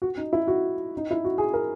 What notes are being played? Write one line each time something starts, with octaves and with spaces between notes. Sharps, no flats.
F#4
D#4
E4
F#4
D#4
E4
F#4
G#4
A#4